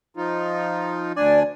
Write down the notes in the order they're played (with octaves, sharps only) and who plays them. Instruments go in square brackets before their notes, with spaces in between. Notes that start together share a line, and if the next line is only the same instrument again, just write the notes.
[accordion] F3 D#4 F4
[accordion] D2 D4 G#5 [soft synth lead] D5